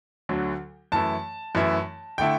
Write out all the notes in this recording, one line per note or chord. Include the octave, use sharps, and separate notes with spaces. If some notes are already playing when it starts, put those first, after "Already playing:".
D2 D3 F#3
F#2 E3 A3 E4 A5
F#2 E3 A3 E4
D3 A3 E4 G5